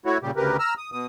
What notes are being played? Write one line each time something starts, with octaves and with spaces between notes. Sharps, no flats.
A3 E4 F#4 C#5
A#2 C#3 G3 G4
D2 C#3 G4 A#4 B4
A#5 E6 F6
D#6
B2 D#6